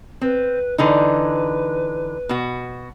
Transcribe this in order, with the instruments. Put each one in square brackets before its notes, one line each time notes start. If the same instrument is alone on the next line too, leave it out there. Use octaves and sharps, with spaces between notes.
[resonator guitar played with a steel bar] C4 [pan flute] B4
[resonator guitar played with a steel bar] D3 E3 D#4 [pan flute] B4
[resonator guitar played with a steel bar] B2 F#4